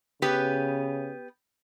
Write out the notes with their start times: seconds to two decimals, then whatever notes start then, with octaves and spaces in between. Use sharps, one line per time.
0.22 C#3 B3 G4 B4